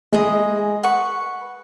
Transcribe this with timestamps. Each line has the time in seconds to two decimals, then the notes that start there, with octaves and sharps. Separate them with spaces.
0.12 G#3 E4 G#4 D#5
0.83 B4 F#5 C#6